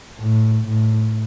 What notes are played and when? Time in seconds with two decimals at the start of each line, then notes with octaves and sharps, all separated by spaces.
0.20 A2
0.67 A2